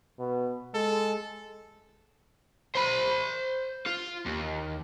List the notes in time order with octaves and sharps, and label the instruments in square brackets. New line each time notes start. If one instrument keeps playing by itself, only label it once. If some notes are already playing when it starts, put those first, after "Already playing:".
[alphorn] B2
[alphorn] G#3 [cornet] A4
[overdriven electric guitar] C5 B5
F4
D#2